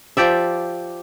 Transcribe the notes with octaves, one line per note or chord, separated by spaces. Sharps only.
F3 G4 D5 E5